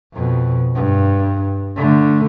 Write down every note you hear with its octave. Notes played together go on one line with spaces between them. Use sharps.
F2 B2
G2
D3 A3